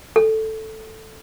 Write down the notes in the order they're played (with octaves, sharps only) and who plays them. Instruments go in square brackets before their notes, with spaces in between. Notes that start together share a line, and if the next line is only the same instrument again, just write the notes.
[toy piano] A4